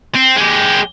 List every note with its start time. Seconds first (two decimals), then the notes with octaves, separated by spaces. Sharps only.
0.15 C4
0.37 G#3 G4